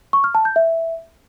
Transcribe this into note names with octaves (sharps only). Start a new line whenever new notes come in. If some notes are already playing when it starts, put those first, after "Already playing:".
C#6
F6
A5
G6
E5